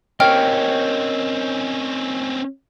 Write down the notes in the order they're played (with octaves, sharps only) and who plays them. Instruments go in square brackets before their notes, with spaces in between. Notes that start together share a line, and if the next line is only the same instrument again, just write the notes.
[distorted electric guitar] C4 C#4 [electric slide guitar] A#4 C#5 D#5 [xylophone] G5 F6